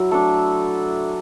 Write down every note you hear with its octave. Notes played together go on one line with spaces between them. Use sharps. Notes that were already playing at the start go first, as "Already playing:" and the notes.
Already playing: F#3 E4
A3 D4 A4